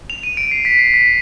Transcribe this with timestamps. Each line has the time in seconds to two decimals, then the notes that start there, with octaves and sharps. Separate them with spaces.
0.10 F7
0.23 D#7
0.37 D7
0.51 C7
0.65 B6
0.79 C7
0.94 B6